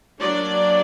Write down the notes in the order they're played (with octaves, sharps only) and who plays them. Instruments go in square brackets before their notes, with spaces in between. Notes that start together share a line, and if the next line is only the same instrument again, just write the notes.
[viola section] F#3 A#3 D4 D5